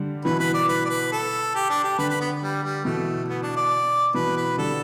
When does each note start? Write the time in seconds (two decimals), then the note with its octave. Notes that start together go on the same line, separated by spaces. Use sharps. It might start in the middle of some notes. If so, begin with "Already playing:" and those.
Already playing: D3 G3
0.25 B2 E3 B4
0.39 B4
0.54 D5
0.69 B4
0.85 D5
0.90 B4
1.12 A4
1.55 G4
1.70 D4
1.84 G4
1.98 D3 B4
2.09 B4
2.20 B3
2.42 G3
2.63 G3
2.85 B2 E3 A3
3.28 B3
3.42 D4
3.57 D5
4.14 B2 E3 B4
4.37 B4
4.58 D3 G3 A4